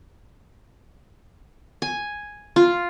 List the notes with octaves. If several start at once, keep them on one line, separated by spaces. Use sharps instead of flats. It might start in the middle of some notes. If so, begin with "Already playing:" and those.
G#5
F4